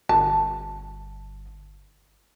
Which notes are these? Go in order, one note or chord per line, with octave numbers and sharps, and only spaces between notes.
G1 A5